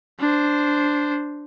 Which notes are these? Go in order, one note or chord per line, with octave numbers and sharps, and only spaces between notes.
D4 C5